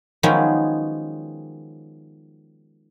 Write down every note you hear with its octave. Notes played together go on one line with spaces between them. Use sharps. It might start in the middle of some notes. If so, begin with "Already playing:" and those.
D#3 F3 F#3 G#3 B3 C#4